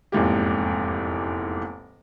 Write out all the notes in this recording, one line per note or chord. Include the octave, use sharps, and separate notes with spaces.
F1 E2 G#2 A#3 G4